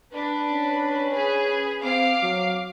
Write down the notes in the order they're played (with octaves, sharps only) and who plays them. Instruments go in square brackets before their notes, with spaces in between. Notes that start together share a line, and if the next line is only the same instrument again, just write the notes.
[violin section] D4 B4
[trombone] C#4
[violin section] G#4 B4
[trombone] C4 [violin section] F5 D6 C7
[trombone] F#3